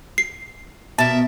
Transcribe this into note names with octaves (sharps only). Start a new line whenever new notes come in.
C7
B2 A#4 E5 A5